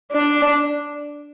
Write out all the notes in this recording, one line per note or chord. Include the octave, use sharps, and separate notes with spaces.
D4